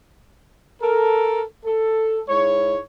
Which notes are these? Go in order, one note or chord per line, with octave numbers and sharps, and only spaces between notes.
A4 A#4
A4
G#2 G#3 E4 C#5